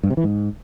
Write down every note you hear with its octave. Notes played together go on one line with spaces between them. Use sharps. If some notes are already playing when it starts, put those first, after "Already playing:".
G2
C3
E3
G#2